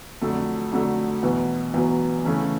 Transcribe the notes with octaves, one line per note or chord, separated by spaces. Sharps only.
F2 D3 F#3 A3
F2 D3 F#3 A3
E2 B2 F#3 B3
E2 B2 F#3 B3
C#3 E3 A3 C#4